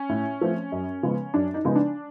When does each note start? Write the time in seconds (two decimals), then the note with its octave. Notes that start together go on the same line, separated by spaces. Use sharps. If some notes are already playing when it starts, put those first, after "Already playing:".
Already playing: C#4
0.09 A2
0.41 F3 A3 C4
0.72 F#2
1.03 C#3 F3 G#3 B3
1.34 F#2 D4
1.54 D#4
1.65 C#3 F3 G#3 B3
1.76 D4